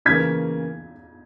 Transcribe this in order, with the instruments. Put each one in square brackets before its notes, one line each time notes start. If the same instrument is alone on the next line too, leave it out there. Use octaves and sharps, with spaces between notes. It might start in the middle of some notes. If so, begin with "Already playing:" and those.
[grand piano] C#3 E3 A#3 [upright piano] G#6 B6